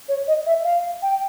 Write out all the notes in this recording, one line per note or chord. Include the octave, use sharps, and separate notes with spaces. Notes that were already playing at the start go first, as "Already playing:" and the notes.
C#5
D#5
E5
F5
G5